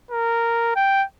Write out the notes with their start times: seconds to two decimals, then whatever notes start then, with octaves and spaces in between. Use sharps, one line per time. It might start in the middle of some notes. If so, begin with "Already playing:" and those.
0.11 A#4
0.76 G5